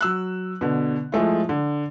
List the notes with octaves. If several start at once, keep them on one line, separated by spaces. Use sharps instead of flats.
F#3 E6 F#6
B2 D3
F3 G#3 A3 E4
D3